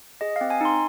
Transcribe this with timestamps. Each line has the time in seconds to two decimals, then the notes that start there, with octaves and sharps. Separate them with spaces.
0.21 G#4 D#5
0.36 F5
0.41 C4
0.50 G#5
0.61 D#4 C6